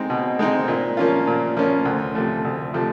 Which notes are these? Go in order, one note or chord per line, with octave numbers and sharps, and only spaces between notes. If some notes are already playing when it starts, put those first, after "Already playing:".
Already playing: G#3 C4 D#4
B2
G#3 C4 D#4
A#2
F3 A#3 C#4 F4
A#2
F3 A#3 C#4 F4
D2
C3 F3 A3
D2
C3 F3 A3